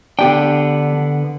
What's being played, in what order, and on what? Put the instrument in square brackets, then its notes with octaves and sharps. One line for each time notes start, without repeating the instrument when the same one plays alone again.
[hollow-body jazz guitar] D3 B3 G5 [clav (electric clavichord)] D4 G4